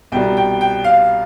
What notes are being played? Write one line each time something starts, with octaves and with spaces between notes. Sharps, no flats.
C2 B2 G3 G5
G5
G5
F5